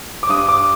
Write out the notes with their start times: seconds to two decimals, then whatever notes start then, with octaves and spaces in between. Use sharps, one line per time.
0.23 D6
0.29 G2 D#6
0.49 D6